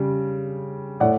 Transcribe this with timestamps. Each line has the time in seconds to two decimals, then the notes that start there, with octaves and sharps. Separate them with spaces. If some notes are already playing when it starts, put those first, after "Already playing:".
Already playing: C#3 G3
1.00 A2 D5 F#5